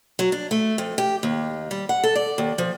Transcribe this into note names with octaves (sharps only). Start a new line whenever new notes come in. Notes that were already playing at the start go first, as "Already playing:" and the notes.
F#3
D4
A3
F2
G4
D#2
G3
F#5
A4
D5
D#2
F3